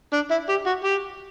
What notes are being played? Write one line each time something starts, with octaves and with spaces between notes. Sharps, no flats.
D4
E4
G4
F#4
G4